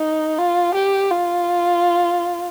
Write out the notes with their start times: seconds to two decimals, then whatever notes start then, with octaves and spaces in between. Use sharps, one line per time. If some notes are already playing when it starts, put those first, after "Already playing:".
Already playing: D#4
0.38 F4
0.74 G4
1.11 F4